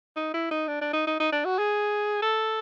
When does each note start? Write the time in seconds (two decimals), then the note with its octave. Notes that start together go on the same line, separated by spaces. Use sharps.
0.16 D#4
0.34 E4
0.51 D#4
0.68 D4
0.81 D4
0.93 D#4
1.07 D#4
1.20 D#4
1.32 D4
1.45 F#4
1.59 G#4
2.22 A4